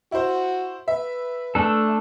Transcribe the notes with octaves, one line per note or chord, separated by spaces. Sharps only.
E4 F#4 C5
B4 E5
A3 D4 A4